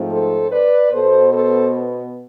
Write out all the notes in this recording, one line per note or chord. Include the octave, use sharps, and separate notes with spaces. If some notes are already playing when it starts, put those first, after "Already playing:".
Already playing: G#2 F3 A3 C4
A4 C5
B4 D5
B2 B3 A4 C5
A4 C5